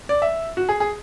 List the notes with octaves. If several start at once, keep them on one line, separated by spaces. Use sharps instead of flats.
D5
E5
F#4
G#4
G#4